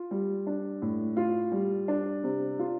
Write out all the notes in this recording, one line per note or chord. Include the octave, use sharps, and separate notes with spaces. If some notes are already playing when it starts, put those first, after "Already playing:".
Already playing: F4
G3
D4
A2
F4
G3
D4
C3
F4